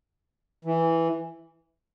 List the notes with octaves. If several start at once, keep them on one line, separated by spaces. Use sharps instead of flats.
E3